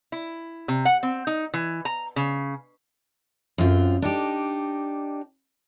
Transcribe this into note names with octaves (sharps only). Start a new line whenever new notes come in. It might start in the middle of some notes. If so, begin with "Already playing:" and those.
E4
C3
F#5
C4
D#4
E3
A#5
C#3
F#2 C4 F4
D4 D#4 G4